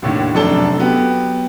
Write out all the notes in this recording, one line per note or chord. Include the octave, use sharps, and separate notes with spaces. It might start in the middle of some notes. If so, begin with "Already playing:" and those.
D#2 A2 D3
F1 F#2 D4 A4 A5 G7
F#3 B3 G4